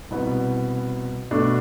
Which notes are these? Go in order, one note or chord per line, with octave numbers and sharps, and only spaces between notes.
C2 B2 B3
B2 A3 D4